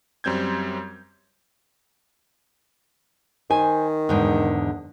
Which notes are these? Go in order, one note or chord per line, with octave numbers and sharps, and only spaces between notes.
F#2 G3 C4 G6 G#6
D#3 C5 G#5
E2 G#2 D3